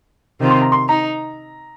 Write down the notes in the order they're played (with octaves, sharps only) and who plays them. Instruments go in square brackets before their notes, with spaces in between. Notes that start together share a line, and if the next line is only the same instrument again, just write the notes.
[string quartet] C3 D#3 C4 F4
[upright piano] C6
A#5
C6
[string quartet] D#4 [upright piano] A#5